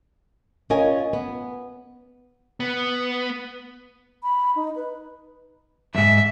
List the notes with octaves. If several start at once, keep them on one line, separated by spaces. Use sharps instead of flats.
C#4 F4 A#4 D#5 G#5
B3
B3
B5
D#4
B4
F2 G#2 E5